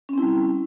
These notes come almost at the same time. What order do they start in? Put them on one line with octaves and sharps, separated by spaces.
C#4 C4 E4 G3